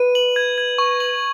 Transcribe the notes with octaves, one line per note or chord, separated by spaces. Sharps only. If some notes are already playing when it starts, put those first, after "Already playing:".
Already playing: B4 D#7
F#7
G#6
G#6
C#6
F#7